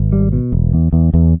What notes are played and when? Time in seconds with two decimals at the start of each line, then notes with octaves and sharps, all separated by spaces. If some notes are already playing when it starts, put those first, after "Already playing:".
Already playing: G#1
0.12 G3
0.32 B2
0.52 E1
0.73 E2
0.93 E2
1.14 E2